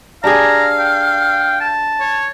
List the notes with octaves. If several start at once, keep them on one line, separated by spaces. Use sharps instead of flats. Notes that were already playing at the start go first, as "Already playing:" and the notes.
D4 G4 G#4 F5 A#5
G5
A5
C#5